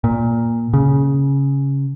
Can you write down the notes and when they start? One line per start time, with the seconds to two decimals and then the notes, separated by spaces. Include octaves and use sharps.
0.04 A#2
0.73 C#3